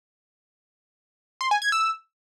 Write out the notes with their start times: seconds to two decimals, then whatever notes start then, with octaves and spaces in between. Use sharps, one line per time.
1.41 C6
1.51 G#5
1.62 G#6
1.72 E6